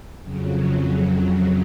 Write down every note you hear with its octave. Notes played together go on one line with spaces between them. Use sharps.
F2 C#3 F#3